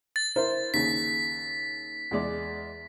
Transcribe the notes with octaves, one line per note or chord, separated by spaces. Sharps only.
A6
E4 A#4 C5
D#2 C#3 B6
E2 G#3 D5